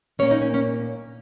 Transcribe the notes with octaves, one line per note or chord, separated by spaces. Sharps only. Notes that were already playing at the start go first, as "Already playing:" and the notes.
A#2 A#3 C#4 C#5
D#4
C#4
C#4